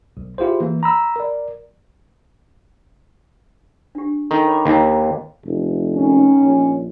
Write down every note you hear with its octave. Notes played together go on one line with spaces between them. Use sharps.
B1
E4 F4 G4 G#4 C5
E3 A#3
A#5 B5 E6
A#4 D5
D4 G4
D#3 A4 G#5
C#5 B5 D6
D#2 D#4 D#5 A#5
F1
D#3 C#4
A#1